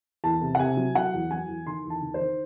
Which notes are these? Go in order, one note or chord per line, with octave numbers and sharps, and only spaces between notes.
E2 A5
C3
F#5
C3 G#5
F#3
F#3 F#5
E2
F#3 G#5
E2
D#3 C6
E2
A5
D#3
C5
D#3